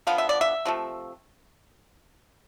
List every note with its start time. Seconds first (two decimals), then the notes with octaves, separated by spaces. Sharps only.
0.07 D3 F3 B3 F5
0.18 E5
0.29 D5
0.41 E5
0.65 C3 F3 A3